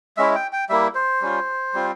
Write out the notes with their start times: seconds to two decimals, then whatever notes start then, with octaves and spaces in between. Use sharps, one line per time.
0.17 G#3 C#4 E4 E5
0.35 G5
0.53 G5
0.69 G3 A#3 E4 E5
0.95 C5
1.21 G3 C#4 F4
1.74 G3 C4 F4